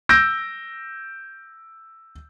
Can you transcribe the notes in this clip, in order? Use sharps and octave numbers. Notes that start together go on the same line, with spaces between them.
E6 G6 A#6 D7